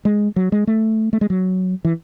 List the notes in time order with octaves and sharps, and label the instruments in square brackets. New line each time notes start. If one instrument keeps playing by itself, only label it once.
[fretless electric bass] G#3
F#3
G#3
A3
A3
G#3
F#3
E3